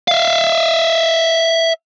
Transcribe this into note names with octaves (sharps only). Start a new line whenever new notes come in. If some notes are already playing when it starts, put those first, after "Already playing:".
E5 F5